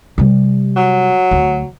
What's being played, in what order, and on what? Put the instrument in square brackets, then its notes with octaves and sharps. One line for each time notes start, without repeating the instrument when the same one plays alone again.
[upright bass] C3 G3
[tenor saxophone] F#3
[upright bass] D2